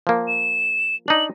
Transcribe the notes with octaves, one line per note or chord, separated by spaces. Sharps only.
F3 A#3
E7
D4 D#4 F#7